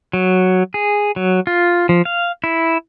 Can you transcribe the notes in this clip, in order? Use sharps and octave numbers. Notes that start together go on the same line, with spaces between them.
F#3
G#4
F#3
F4
F3
F5
E4